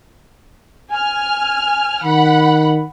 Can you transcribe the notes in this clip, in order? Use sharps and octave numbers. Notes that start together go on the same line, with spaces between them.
G#5 F6
D#3 F#5 B5